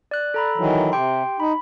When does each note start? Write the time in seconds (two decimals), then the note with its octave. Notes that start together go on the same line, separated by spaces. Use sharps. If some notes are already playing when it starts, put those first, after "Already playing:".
0.11 D5 F#6
0.34 A4 A#5 B5
0.57 D#3 E3 F#3
0.92 C3 G4 G5 C6
1.40 D#4 B5